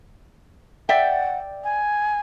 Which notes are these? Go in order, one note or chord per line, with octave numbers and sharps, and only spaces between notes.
D5 E5 F#5 G5
G#5